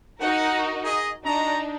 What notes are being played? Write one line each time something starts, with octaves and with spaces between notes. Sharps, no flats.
D#4 F#4 A#4 F#5
G#4 D#5
D4 D#4 F#4 D#5 A#5